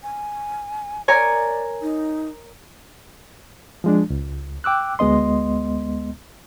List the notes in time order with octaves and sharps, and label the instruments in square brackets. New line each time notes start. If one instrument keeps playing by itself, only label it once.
[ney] G#5
[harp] A#4 C#5 G#5 [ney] D5
[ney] D#4
[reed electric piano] F3 G#3 D4
C#2
G5 D6 E6 F#6
D2 G#3 B3 D#5 C6